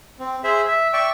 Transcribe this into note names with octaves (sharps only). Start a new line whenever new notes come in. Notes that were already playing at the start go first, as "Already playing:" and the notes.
C4
G#4 C5 E5
E5
D5 E5 G5 C#6